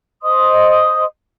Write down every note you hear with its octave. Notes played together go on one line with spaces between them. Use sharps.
C5 D#5 C6 D#6